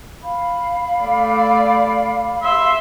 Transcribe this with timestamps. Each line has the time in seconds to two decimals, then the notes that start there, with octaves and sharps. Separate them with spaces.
0.23 F5 B5
1.02 A3 D5
2.42 E5 C6